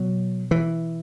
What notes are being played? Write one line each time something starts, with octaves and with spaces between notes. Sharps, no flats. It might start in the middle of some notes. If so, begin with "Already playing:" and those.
Already playing: B2 F#3
E3